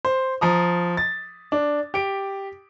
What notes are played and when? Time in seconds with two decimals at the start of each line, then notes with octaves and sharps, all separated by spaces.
0.05 C5
0.41 F3 A#5 D#6
0.97 A6
1.52 D4
1.94 G4 D7